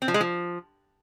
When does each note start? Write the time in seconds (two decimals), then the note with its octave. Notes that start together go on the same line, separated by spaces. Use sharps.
0.02 C4
0.08 F3
0.14 G#3
0.21 F3